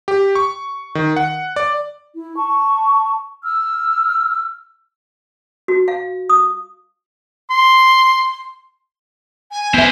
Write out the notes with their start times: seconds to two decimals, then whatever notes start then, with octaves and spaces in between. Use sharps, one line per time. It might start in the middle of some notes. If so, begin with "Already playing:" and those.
0.08 G4
0.35 C#6
0.95 D#3
1.17 F#5
1.56 D5
2.15 E4
2.36 A5 C#6
3.44 E6 F6
5.68 F#4
5.88 F5
6.29 D#6
7.50 C6
9.51 G#5
9.74 B3 E4 C5 E5